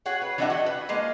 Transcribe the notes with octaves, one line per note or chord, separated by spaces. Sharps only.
F#4 G#4 C#5 F#5
B4
E3 G3 D4 D#5 E5 F#5
F#4 G4 F#5
B4
F3 G#3 A#3 D#5